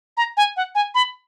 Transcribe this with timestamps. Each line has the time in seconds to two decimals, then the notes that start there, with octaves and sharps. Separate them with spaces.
0.17 A#5
0.37 G#5
0.57 F#5
0.75 G#5
0.95 B5